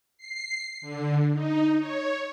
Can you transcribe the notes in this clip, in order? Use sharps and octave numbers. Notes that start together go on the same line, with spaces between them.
C7
D3
D#4
C#5